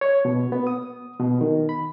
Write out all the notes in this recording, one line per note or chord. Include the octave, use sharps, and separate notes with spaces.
C#5
B2
B3
D#6
B2
D#3
B5